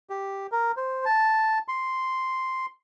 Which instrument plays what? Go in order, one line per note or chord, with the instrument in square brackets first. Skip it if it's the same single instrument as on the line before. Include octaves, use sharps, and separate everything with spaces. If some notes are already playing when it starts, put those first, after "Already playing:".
[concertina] G4
A#4
C5
A5
C6